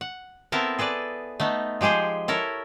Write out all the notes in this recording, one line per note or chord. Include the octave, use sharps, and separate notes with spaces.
F#5
B3 C4 E4 A4 A#4
G#4 A4 B4 D5
A3 B3 D#4
F3 G#3 G4 G#4 C5
E4 A4 A#4 C#5